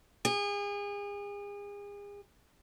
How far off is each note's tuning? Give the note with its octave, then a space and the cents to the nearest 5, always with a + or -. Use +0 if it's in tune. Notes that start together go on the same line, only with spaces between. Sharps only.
G#4 -35